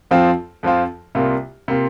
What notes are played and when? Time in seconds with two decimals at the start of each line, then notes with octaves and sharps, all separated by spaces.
0.11 F2 F3 C4 F4
0.63 F2 F3 C4 F4
1.15 C2 C3 A#3 F4
1.68 C3 A#3 F4